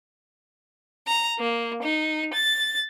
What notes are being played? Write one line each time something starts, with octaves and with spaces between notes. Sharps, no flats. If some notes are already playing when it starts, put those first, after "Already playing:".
A#5
A#3
D#4
A6